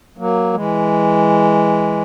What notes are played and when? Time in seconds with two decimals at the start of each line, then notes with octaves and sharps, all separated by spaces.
0.18 F#3 A#3
0.53 E3 G#3